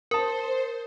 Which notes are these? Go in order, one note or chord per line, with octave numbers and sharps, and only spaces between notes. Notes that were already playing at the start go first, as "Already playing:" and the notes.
A#4 C5 A5 D#6